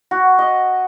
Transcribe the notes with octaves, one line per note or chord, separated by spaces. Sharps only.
F#4
D#5